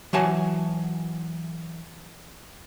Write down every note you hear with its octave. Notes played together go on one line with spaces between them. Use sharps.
E3 F#3 G#5 A5